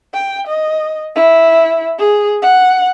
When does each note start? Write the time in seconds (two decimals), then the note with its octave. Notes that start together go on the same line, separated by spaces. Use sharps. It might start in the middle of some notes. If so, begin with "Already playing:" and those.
0.14 G5
0.47 D#5
1.16 E4
1.99 G#4
2.42 F#5